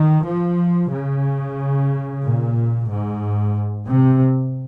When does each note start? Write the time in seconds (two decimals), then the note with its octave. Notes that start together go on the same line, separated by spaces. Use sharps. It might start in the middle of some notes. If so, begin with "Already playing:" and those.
Already playing: D#3
0.24 F3
0.91 C#3
2.23 A#2
2.89 G#2
3.88 C3